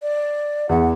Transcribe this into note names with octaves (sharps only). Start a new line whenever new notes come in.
D5
E2 F#5